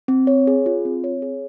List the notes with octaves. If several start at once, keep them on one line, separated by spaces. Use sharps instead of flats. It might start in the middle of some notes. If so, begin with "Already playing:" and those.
C4
C#5
G#4
F4
C4
C#5
G#4